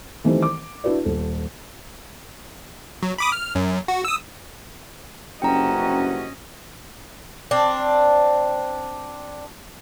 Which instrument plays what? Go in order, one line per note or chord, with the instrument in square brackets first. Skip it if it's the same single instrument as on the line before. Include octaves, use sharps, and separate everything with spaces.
[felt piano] D#3 E3 G3 A3 C4
D6
D4 E4 F#4 B4 D5
D#1 A4
[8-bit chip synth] F#3
B5 D6 D#6
F6
F#2
F#4
D#6 E6
[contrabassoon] F#1 [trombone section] G2 C3 F#4 [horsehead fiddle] C#4 D#5 [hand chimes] G5 A#5
[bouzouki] C4 D4